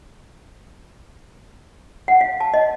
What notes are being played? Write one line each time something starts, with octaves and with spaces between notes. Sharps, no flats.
F#5
F5
A5
D#5